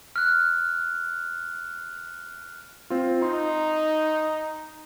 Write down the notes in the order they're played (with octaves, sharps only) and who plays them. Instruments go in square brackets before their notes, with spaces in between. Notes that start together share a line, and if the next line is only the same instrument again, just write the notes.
[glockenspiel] F6 F#6
[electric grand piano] C4 F4
[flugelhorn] D#4 [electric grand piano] C6